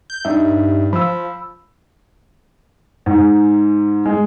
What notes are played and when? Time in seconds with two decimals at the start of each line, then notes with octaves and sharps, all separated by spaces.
0.10 G6
0.25 G2 D4 D#4 E5
0.93 F3 B5 E6
3.06 G#2
4.06 G#3